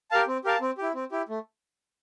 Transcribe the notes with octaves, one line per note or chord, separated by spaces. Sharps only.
G4 A#4 F5 A5
C4
G4 A#4 F5 A5
C4
E4 G4
C4
E4 G4
A3